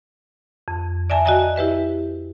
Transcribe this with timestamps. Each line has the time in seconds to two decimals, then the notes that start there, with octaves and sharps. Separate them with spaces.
0.68 F2
1.10 D5 E5 G#5 A5
1.25 F#4 D5 D#5 G5 G#5 A#5
1.56 E4 G4 B4 E5